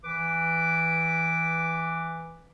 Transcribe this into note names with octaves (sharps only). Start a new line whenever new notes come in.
E3 B4 D6